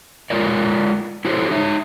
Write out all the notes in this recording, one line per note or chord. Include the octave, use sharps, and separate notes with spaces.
G#3 F4 A#4 C#5 D5
E4 F#4 G4 A4 C5 C#5
D#4 C#5 E5